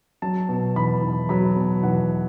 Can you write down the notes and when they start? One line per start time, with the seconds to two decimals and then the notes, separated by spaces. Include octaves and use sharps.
0.22 F#3 A5
0.49 B2
0.76 E2 B5
1.02 E2
1.29 F#3 B5
1.56 B2
1.83 E2 F#5